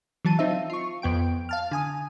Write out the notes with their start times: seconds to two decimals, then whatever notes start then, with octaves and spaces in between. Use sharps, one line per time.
0.25 E3 F#3 A5 D#7
0.39 C4 D#4 F4 E5
0.70 F4 C#6
1.02 F2 B3 G5 D7
1.49 F5 A5 F6
1.71 D3 G#5 D#6